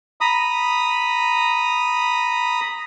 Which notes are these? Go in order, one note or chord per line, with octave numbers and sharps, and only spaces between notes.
A#5 B5 D#6